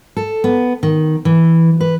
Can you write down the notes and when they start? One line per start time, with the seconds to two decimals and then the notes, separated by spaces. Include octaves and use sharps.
0.17 A4
0.44 B3
0.83 D#3
1.25 E3
1.81 B4